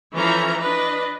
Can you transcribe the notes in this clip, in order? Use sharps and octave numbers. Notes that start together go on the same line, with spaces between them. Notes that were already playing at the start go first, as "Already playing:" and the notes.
E3 F3 C#4 A4 C#5 A#5
D4 B4 D#5